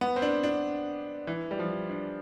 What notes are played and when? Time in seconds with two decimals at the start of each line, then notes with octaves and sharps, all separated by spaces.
0.01 B3
0.16 C4
0.22 D4
0.43 D4
1.27 E3
1.51 G3
1.59 F3
1.90 D4